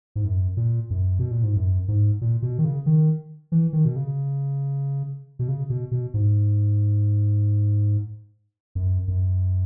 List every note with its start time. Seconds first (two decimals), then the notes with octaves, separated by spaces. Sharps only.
0.16 G#2
0.25 F#2
0.57 A#2
0.90 F#2
1.19 B2
1.31 A#2
1.43 G#2
1.56 F#2
1.88 G#2
2.21 A#2
2.42 B2
2.58 D#3
2.65 C#3
2.86 D#3
3.52 E3
3.73 D#3
3.85 B2
3.96 C#3
5.39 B2
5.48 C#3
5.70 B2
5.91 B2
6.14 G#2
8.75 F#2
9.08 F#2